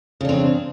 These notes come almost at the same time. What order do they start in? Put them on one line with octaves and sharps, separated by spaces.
C#3 D4 C4